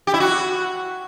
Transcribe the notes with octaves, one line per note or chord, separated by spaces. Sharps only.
G4
E4
F#4